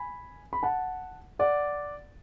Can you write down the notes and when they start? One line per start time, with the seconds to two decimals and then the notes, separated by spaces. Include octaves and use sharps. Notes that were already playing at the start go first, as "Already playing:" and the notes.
Already playing: G#5 B5
0.53 B5
0.63 F#5 A5
1.39 D5 F#5